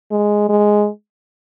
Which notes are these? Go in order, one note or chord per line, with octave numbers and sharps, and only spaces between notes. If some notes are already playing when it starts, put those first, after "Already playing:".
G#3
G#3